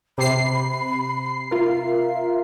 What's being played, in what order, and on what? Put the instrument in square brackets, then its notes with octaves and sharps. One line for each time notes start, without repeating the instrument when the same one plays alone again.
[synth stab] C3 C7 [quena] B5
[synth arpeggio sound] F4 A#4 [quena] E5